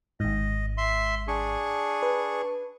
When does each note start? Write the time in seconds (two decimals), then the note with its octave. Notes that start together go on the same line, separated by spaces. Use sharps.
0.20 G#1 G#2 D#5
0.77 E5 C6
1.28 D4 G#4 C#6
2.03 B4